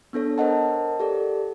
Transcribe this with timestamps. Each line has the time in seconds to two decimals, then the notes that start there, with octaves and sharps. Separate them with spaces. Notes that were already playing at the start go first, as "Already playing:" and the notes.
0.13 B3 D4 A4 C#5
0.38 A#4 C5 C#5 D#5 F#5 A5
1.00 G4 A4 D5